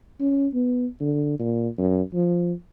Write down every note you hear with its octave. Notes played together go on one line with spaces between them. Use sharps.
C#4
B3
D3
A#2
F#2
F3